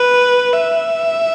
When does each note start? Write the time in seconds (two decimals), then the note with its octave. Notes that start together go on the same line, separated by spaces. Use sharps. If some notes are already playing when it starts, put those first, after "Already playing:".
Already playing: B4
0.53 E5